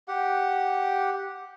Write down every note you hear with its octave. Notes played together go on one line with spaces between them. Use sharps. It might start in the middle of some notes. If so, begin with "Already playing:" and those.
G4 F#5